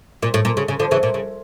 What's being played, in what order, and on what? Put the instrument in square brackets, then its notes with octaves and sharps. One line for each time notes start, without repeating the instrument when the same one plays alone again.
[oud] A#2
A2
A#2
C#3
C#3
D3 F3
C#3 E3
A#2
C#3